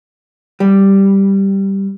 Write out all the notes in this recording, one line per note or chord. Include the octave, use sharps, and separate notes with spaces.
G3